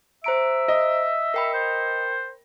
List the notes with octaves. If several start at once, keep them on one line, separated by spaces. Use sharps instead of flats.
C5 E5 A#5 D7
D#5
A#4 G5 B5
C5